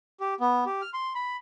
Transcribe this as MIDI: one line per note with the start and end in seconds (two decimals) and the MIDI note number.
0.20 0.34 67
0.40 0.64 59
0.66 0.81 67
0.82 0.90 89
0.94 1.13 84
1.15 1.37 83